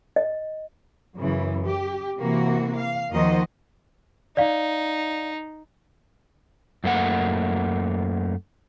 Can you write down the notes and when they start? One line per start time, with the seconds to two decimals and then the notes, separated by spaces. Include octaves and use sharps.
0.16 D#5
1.17 F#2 C#3 E3
1.66 G4
2.19 C3 E3 A#3 F#4
2.78 F5
3.12 D#2 D#3 F3 F#4 C5 D#5
4.37 D#4 D5 F5
6.84 F#2 A3 A#3 F#5